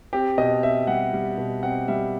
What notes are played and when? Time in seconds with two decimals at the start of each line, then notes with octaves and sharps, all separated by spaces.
0.13 C4 G4
0.38 B2 D#5
0.62 C4 E5
0.87 G3 F#5
1.13 G3
1.38 B2
1.62 C4 F#5
1.88 G3 E5